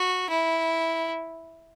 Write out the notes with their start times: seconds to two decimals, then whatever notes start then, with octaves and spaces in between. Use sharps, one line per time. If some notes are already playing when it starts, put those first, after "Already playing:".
Already playing: F#4
0.29 E4